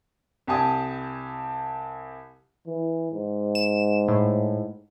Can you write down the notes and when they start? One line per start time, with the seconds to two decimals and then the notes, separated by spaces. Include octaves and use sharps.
0.47 C2 G4 G#5 A5 D#6
2.67 E3
3.12 G#2
3.55 E7
4.08 A2